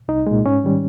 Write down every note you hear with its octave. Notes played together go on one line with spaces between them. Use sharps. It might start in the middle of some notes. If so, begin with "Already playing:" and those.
C2 D#4
A#2 G#3
G#2 C#4
D#3 G3